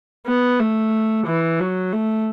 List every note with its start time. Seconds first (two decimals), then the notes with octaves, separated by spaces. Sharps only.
0.27 B3
0.60 A3
1.26 E3
1.60 F#3
1.93 A3